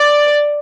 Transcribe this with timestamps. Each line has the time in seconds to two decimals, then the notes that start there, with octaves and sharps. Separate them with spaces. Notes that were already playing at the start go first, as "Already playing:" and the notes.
Already playing: D5